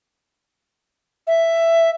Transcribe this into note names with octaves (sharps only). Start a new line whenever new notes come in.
E5